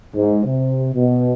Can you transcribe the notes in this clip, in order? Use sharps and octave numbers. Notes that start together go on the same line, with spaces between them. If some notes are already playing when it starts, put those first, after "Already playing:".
G#2
C3
B2